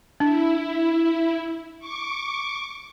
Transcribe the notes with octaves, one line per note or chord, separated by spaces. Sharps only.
D4 E4
C#6 D6